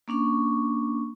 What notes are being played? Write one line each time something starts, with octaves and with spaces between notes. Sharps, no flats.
A#3 C#4 D4 C#6